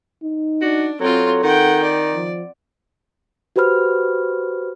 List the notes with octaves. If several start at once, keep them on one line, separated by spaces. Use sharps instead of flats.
D#4
D4 F#4
F#3 C4 F4 A4
D#3 F#5 G5
D5
F3
F#4 G4 B4 C5 B5 F6